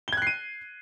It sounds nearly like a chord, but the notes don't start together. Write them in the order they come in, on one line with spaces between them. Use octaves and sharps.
G7 G#6 F#6 C7 D#7